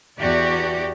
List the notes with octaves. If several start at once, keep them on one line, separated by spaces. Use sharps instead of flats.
E2 F#4 G4 D5